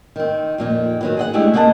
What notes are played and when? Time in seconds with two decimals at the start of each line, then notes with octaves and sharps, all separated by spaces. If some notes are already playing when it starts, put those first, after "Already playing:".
0.16 D#3 C4
0.58 F2 A#2 D#3
1.01 D#3 F#3 B3
1.17 G#4 D#5 F#5
1.33 G#3 A3 D4 E4 G4 G#4
1.54 C#3 A#3 D#5 F#5 G5 A5